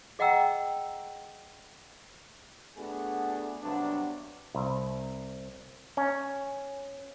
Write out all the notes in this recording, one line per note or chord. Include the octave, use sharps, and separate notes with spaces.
G#4 D#5 F#5 G5 A#5 E6
A3 B3 D4 F#4 G#4 A4
G2 C3 F#3 B3 D4
C2
C#4